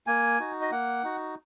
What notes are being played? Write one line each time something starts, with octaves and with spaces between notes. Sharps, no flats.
A#3 G#5
D#4 F#4
D#5
A#3 F#5
D#4 F#4